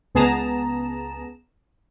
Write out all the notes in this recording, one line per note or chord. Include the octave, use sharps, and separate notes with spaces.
C#2 B3 G#4 A5 A#5 E7